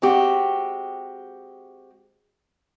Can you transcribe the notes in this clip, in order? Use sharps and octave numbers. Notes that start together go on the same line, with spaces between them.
G#3 C4 F#4 G4